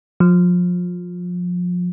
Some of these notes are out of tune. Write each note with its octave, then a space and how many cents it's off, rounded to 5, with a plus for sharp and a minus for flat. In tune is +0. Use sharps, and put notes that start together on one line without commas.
F3 +30